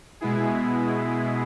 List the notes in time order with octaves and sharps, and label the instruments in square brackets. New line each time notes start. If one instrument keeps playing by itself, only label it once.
[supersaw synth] B2 G#3 B3 E4 G#4